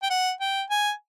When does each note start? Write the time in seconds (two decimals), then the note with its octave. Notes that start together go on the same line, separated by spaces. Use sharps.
0.03 G5
0.10 F#5
0.40 G5
0.70 G#5